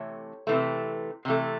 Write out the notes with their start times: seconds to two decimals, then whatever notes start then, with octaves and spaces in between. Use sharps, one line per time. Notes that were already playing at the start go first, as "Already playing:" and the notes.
Already playing: C3 E3 A3 C#5
0.47 C3 E3 A3
1.25 C3 E3 A3